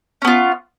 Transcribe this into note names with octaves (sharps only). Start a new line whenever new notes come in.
B3 C#4 F4